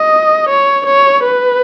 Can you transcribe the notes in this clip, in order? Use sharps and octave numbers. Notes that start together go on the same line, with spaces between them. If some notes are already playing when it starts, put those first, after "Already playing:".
Already playing: D#5
C#5
C#5
B4